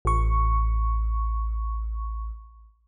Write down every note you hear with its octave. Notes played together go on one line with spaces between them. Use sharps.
A1 C#6